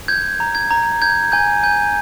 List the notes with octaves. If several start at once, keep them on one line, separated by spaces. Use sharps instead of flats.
G6 G#6
A#5
G#6
A#5
G6 G#6
G#5 G6
G#5 G6